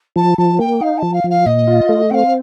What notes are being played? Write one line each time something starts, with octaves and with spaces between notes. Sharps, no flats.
F3 A5
F3 A5
A#3 G5
D#4 F5
A5
F3
F5
F3
F5
A#2 D#5
F4
A3
C4 F5 G5